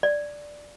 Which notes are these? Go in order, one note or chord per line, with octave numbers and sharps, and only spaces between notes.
D5